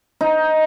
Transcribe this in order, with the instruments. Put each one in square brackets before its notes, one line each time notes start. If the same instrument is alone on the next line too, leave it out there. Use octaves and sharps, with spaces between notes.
[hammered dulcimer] D#4